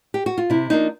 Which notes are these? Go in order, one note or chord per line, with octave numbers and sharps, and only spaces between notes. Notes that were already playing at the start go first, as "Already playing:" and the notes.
G4
F#4
F4
C3 E4
F3 A#3 D4 D#4